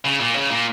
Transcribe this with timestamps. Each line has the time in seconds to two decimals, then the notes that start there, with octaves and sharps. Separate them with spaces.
0.05 C#3
0.20 A#2
0.35 C#3
0.51 A#2